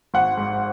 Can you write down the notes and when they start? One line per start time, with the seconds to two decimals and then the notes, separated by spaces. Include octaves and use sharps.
0.14 G#1 F#5
0.37 G#2